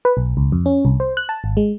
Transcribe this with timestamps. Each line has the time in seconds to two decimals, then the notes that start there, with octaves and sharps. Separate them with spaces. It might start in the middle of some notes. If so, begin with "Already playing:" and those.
0.05 B4
0.17 B1
0.37 C#2
0.52 F2
0.66 C#4
0.85 C2
1.00 C5
1.17 F#6
1.29 A5
1.44 G#1
1.57 G#3